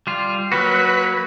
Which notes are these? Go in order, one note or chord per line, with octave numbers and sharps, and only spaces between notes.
G3 F4
F#3 A#3 F#4 B4